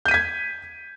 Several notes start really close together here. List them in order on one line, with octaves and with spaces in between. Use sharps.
G6 D#7 B6 G#6